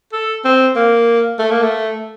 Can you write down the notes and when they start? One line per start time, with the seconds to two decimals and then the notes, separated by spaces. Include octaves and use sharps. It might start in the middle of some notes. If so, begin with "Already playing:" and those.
0.12 A4
0.45 C4
0.76 A#3
1.39 A3
1.51 A#3
1.62 A3